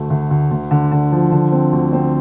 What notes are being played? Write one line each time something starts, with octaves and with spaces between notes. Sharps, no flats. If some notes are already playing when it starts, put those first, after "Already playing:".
Already playing: D2 A3
D2
D2
D2
D3
D3
F3
D3
C4
D2
C4